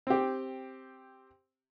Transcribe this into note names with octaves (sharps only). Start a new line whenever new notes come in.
C4 G4